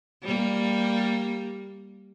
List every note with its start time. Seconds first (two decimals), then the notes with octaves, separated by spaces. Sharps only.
0.23 G3 A#3